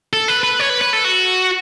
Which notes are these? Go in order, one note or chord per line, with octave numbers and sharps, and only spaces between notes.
A4
B4
B4
C#5
B4
B4
A4
F#4